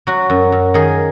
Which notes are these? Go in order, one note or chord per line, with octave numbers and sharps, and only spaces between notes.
F#3 F#4
F#2
F#2
D#3 G#4